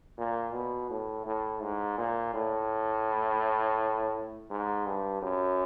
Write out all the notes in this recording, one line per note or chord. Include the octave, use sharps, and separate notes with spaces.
A#2
B2
A2
A2
G#2
A#2
A2
G#2
G2
F#2